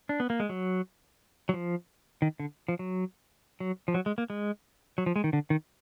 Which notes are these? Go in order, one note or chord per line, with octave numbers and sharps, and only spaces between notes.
D4
B3
A#3
G#3
F#3
F#3
F3
D#3
D3
F3
F#3
F#3
F3
F#3
G#3
A#3
G#3
F#3
F3
G#3
D#3
D3
D#3